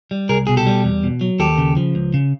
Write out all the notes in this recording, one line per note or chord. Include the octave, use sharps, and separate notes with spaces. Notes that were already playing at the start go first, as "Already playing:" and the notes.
G3
C2 G#4 A#4
B2 G#4
G4 A4
G3
E2
B2
F#3
D#2 G4 A4
C#3
F3
C#2
C#3